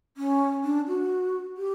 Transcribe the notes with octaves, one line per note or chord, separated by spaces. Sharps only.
C#4
D4
F#4
G4